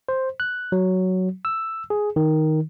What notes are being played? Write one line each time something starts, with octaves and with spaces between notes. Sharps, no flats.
C5
F#6
F#3
E6
G#4
D#3